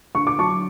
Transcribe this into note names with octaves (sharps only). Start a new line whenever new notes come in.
D3 C#6
D6
F#3 A5 C#6